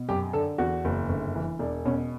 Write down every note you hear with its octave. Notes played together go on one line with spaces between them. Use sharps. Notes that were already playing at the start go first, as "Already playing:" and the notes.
Already playing: B2
F#2 G4
D3 A4
E2 F#4
F#1
G1
E3
E1 D4
B2 C#4